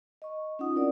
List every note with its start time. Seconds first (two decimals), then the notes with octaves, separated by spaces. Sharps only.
0.22 D#5 C#6
0.59 C#4 D#4 F4 F#5 D#6
0.75 C4 E4 A#4 D5